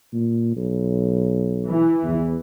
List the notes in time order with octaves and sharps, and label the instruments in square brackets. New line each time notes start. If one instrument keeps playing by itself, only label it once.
[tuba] A#2
B1
[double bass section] E3
[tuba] E2